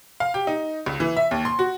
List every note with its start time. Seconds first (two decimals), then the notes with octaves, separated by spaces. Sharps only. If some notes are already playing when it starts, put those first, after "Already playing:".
0.20 F5
0.34 G4
0.47 D#4
0.86 C#2
1.00 E3
1.16 E5
1.31 D#2
1.45 C6
1.59 F#4